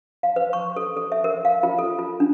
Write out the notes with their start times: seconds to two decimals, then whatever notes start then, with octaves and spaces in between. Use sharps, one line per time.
0.23 F5
0.36 B4
0.53 C#6
0.76 A4
0.97 A4
1.12 E5
1.24 A#4
1.45 F5
1.63 F4
1.79 A4
1.99 F4
2.20 D4